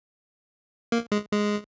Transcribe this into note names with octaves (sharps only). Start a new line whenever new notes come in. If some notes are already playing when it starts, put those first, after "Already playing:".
A#3
G#3
G#3